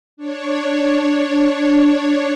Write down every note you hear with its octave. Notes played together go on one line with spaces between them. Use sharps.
D4 C#5